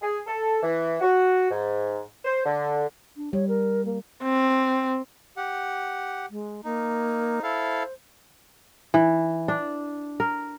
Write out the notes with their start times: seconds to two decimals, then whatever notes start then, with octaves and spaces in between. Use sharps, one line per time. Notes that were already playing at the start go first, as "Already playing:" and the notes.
0.02 G#4
0.27 A4
0.62 E3
1.01 F#4
1.50 G#2
2.25 C5
2.45 D3
3.16 D4
3.33 G3 C#5
3.48 A#4
3.85 A#3
4.22 C4
5.37 G4 F#5
6.30 G#3
6.64 A#3 D#4
7.43 E4 A4 C5 F5
8.94 E3
9.48 D4
10.20 A#4